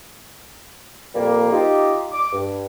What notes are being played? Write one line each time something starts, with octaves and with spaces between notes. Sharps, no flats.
F2 A#2 F3 G3 A#3
D#4 F4 G4
D6
G2